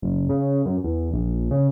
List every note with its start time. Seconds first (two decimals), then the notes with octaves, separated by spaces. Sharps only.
0.02 F#1
0.29 C#3
0.65 F#2
0.84 E2
1.13 A#1
1.51 C#3